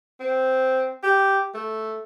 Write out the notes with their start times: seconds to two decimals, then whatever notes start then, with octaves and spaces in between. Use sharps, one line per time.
0.20 C4
1.03 G4
1.54 A3